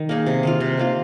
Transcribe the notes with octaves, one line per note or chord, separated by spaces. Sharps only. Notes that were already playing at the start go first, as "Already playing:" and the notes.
Already playing: D#3
A#3 D#4 G#4
C3
D#3 A#3 F4
C3
D#3 A#3 F4